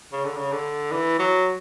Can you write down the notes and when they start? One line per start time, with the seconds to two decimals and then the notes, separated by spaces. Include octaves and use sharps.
0.12 C#3
0.25 D3
0.36 C#3
0.52 D3
0.92 E3
1.19 F#3